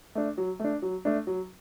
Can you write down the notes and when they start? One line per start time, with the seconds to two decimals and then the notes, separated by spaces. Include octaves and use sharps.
0.15 A3 D4
0.38 F#3
0.60 A3 D4
0.82 F#3
1.05 A3 D4
1.27 F#3